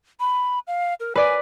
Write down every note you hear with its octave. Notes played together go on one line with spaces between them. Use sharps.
B5
F5
A#4
B4 D5 G#5